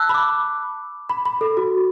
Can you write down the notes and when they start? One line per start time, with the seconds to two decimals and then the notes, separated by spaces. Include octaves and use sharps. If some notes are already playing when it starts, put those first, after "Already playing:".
Already playing: A5 E6 F#6
0.09 B5
0.14 D6
1.09 B5
1.25 B5
1.41 A4
1.57 F#4